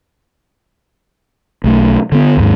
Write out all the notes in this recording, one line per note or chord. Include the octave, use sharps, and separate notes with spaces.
B1 A3
D3 B3
D#2 G#2